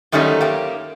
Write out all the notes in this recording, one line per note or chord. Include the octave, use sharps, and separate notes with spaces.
F#2 D#3 G3 A3 C#4 D#4
A#3 G4